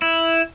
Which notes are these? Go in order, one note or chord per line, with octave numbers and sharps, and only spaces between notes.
E4